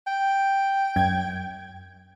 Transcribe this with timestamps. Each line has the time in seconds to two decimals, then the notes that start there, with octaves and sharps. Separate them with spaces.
0.07 G5
0.96 F#2 G#6